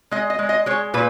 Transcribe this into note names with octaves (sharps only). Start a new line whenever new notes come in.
G#3 D#5
D#5
G#3
D#5
G#3 C#5
A#2 B4